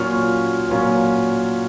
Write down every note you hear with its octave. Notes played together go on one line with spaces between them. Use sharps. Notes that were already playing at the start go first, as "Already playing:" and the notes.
Already playing: A#2 F#3 A#3 C#4 F4 C#6 F6
A#2 F#3 A#3 C#4 F4